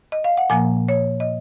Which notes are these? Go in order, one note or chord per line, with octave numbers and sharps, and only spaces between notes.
D#5
F5
F#5
A#2 F3 A#3 G#5
C#5
D#5